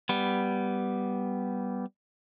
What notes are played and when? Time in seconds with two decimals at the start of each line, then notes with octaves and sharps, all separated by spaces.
0.09 G3 B3